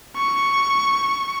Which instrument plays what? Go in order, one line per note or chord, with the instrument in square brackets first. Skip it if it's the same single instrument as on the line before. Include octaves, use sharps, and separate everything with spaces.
[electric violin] C#6